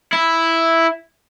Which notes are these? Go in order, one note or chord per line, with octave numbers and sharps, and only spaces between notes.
E4